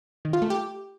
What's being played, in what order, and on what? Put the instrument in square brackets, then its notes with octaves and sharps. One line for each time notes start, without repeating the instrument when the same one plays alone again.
[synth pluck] D#3
F4
A3
G4